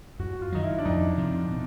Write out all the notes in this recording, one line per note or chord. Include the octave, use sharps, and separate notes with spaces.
F#2 F#4
F4
D#3 F#3 D#4
E4
D4
F2 D#4
C3 F3
B2